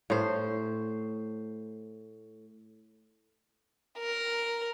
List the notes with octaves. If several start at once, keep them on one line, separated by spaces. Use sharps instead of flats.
A2 C5
A#4